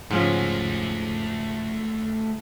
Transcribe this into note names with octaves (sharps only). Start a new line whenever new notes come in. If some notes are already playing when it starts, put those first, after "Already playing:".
G#2 F3 A3 C#4 F#4